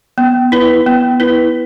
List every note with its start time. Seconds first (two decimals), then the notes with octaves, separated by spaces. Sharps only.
0.18 B3
0.52 E4 B4
0.87 B3
1.20 E4 B4